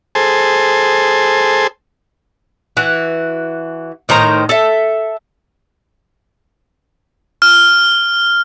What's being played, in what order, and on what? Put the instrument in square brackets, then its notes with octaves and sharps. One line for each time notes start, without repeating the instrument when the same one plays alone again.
[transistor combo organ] G#4 A4 C5
[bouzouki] E3 F#4
A2 D#3 C5 A#5
A4 E5
[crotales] F6